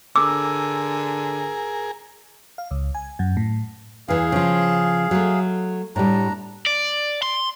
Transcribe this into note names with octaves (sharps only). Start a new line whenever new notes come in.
D3 G#4 A#4 D6 E6
F5
C#2
G#5
F#2
A2
E2 E3 G#4 F5
C#3 F3
F#3 A3
A2 G3 D4 A#5
D5
C6